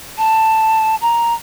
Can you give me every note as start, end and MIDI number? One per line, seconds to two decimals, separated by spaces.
0.18 0.95 81
1.01 1.34 82